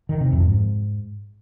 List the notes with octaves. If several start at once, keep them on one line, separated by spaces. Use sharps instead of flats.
D#3
C3
F2
G#2